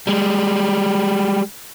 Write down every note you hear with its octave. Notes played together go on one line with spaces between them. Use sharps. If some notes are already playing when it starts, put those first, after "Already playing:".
G3 G#3